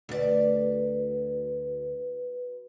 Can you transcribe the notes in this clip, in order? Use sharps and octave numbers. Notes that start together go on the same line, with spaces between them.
D2 F#4 B4 D5